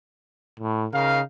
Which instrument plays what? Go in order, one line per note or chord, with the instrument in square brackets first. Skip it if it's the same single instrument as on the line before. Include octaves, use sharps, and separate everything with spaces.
[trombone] A2
[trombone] C#3 [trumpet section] D#4 A#4 F5